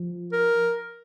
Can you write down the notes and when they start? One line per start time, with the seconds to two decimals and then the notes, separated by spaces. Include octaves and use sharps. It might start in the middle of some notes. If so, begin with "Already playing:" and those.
Already playing: F3
0.32 A#4